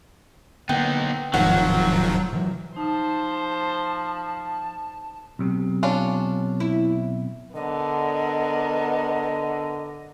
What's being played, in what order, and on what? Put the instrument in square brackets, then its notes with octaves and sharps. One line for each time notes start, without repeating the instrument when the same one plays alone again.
[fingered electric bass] D3 A#3 [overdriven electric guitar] B3 D#4 [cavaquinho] G5
[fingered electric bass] D#1 C3 [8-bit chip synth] G#2 D#3 F3 [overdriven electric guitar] F#3 [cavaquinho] F#5
[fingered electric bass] C3 E3 F#3
[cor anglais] F3 [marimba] D#4 [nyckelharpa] C5 [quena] A5
[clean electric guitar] B1 C3
[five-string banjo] C#4 D4 F4
[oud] E4
[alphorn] D3 [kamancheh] B3 A#4 [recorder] D#5